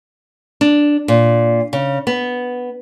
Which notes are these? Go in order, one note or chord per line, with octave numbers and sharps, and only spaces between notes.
D4
A#2
C#3
B3